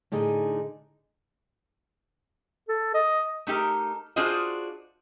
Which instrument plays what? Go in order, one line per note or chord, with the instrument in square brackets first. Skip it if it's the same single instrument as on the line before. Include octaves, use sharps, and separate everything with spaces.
[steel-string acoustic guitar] A2 D3 D#4 G#4
[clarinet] A4
D#5
[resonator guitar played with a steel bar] A3 D#4 G4 A4 A#4
D4 F4 F#4 G#4 C5 D#5